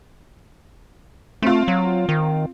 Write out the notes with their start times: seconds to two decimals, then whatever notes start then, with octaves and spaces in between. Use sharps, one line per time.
1.42 A3 C4 F4
1.68 F#3
2.09 D#3